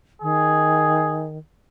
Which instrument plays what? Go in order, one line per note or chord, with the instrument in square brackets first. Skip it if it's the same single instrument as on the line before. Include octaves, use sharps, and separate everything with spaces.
[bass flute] D#3 [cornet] G#4